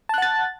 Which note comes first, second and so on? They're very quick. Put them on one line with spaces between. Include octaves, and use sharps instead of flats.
A5 F#6 F#5 A6